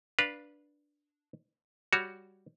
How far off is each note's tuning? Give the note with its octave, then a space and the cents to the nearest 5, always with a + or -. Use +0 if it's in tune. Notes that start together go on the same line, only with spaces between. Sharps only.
D4 +0 B4 -15 F5 +0
G3 +0 F#4 +0 C#5 +15